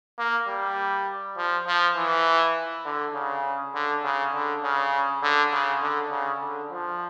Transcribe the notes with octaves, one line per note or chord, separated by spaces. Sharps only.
A#3
G3
F3
F3
E3
D3
C#3
D3
C#3
D3
C#3
D3
C#3
D3
C#3
D3
F3